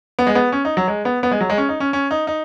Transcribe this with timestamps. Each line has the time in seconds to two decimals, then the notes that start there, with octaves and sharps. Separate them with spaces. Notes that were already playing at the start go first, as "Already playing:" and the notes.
0.19 B3
0.27 G#3
0.35 B3
0.52 C#4
0.65 D#4
0.77 F#3
0.88 G#3
1.05 B3
1.23 B3
1.31 G#3
1.41 F#3
1.50 G#3
1.58 C#4
1.69 D#4
1.80 C#4
1.93 C#4
2.11 D#4
2.27 D#4